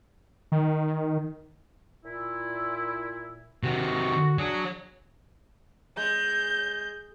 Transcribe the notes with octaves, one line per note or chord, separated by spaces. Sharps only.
D#3
A#2 E4
C3 D#3 F#4
F#3 D4 F#4 G#4
G#3 G6